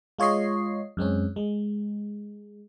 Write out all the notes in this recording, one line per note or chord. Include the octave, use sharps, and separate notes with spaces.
G#3 F4 C#5 D#5 C7
F#2 G#3 C4 C#4
G#3